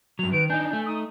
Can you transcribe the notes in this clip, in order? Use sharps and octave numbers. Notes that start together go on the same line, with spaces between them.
G2 F#3 F7
D#3 B4 D7
D4 D#4 G#5 G6
A3
D#4 D#6